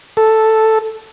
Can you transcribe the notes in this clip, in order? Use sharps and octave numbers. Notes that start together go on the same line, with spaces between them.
A4